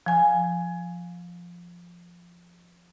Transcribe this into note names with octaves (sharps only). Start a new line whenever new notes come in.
F3 G#5